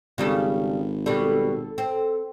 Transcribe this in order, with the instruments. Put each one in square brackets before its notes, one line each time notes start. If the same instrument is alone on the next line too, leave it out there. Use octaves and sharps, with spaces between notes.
[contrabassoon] G#1 [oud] C#3 G3 A4
[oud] B2 G3 [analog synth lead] A4
[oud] C4